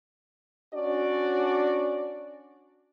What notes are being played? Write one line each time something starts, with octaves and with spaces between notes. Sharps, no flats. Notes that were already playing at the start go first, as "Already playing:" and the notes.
C#4 D4 F#4 D5